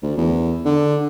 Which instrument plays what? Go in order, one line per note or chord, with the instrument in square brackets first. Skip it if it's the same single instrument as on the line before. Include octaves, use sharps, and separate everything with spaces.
[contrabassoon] D2
E2
D3